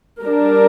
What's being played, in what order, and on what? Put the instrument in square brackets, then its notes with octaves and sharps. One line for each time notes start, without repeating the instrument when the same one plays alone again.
[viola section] G3 D4 A#4